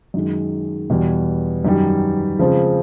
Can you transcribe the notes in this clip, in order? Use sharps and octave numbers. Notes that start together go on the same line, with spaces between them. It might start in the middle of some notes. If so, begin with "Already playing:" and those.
F#2 D#3 G#3
E2 B2 G3
F#2 D#3 G3
C#3 F3 G#3 C4